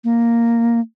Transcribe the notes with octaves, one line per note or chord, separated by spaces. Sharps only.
A#3